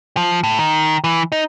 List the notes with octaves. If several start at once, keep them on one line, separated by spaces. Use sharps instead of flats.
F3
A2
D#3
E3
D#4